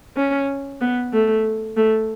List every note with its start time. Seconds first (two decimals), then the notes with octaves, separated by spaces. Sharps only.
0.16 C#4
0.81 B3
1.13 A3
1.77 A3